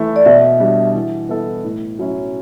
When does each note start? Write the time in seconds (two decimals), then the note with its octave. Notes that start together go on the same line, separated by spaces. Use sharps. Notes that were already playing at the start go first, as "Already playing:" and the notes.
Already playing: E3 A3 E4
0.16 D5
0.25 B2 E5
0.60 G3 D4 F#4
0.94 E3
1.29 B3 E4 A4
1.64 A2
1.99 F#3 C#4 E4